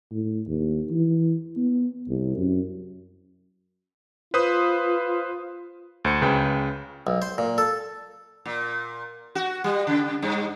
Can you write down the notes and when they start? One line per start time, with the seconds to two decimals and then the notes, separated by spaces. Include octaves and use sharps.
0.11 A2
0.47 D#2
0.91 E3
1.57 B3
2.09 C2
2.38 F#2
4.34 F4 B4 C5 D#6
6.05 D2 C5 C#7
6.21 C#2 C#3 B4 G5
7.07 B1
7.22 C5
7.38 A#2
7.58 A4
8.46 A#2
9.35 F#4
9.64 G3
9.87 C#3
10.22 G2